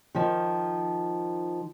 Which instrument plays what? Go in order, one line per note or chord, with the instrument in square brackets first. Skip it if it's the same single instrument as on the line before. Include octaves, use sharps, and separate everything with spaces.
[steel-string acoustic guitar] D#3 F3